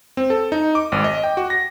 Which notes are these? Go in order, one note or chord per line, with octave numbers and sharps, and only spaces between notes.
C4
A4
D#4
D6
G#1
D#5
G5
F#4
A#6